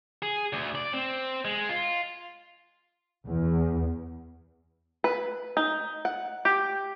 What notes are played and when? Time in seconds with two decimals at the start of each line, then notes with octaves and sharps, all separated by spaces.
0.22 G#4
0.53 D2
0.75 D5
0.93 C4
1.45 G#3
1.69 F4
3.27 E2
5.04 B4
5.57 D#4
6.05 F#5
6.45 G4